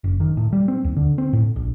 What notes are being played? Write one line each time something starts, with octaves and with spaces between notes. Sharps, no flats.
F#1
D#3
A2
G3
C4
D#2
D3
C4
A2
A#1